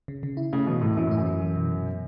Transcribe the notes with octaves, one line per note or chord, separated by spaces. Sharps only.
C#3
C#3
E4
C#3 A3
B2 E3
A2 E3
F#2 E3
A2 E4
F#2
E3
E3
B2
B2
B2